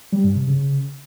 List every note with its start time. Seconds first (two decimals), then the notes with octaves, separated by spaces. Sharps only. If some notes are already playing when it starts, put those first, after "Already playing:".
0.13 G3
0.24 G2
0.36 C3
0.47 C#3